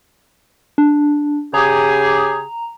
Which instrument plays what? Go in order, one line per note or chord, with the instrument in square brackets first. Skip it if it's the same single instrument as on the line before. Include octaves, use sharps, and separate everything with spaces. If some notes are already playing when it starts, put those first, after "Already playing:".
[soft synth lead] D4
[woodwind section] C#3 G4 G#4 [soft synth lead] A#5